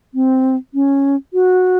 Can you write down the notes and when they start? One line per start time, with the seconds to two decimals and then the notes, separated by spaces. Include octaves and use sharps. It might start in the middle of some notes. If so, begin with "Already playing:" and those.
0.14 C4
0.74 C#4
1.33 F#4